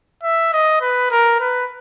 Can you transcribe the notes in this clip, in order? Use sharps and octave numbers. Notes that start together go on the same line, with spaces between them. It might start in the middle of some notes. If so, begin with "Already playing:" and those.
E5
D#5
B4
A#4
B4